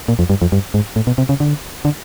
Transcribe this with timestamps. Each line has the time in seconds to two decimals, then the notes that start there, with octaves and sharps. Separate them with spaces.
0.08 A#2
0.19 F2
0.30 G2
0.42 F2
0.52 G2
0.74 G#2
0.96 A2
1.07 B2
1.18 C3
1.29 C#3
1.40 D3
1.85 D3